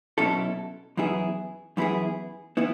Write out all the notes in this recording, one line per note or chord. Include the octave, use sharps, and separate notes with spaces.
B2 F#3 C#4 E4 A4
F#2 E3 B3 E4 G#4
F#2 E3 B3 E4 G#4
E3 B3 E4